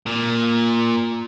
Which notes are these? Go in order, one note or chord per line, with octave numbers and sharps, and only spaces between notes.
A#2